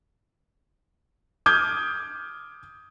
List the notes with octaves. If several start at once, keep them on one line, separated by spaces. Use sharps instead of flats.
D6 D#6 F6 G6 G#6